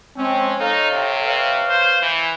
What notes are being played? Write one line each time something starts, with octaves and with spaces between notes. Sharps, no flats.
F3 G#3 C4 C#4
D#4 A4 C#5 F5
C3
B4 C#5 F5
C5
E3